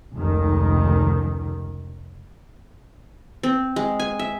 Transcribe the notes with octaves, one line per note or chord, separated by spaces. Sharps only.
F1 C#2 D#3
C4
G#3
G#5
E5